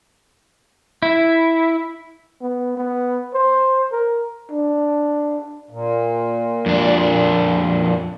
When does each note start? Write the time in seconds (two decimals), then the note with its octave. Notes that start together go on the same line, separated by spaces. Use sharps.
1.02 E4
2.41 B3
2.77 B3
3.34 C5
3.92 A#4
4.52 D4
5.71 A#2
6.66 F2 D4